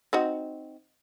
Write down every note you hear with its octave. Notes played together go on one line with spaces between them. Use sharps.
C4 D#4 F#4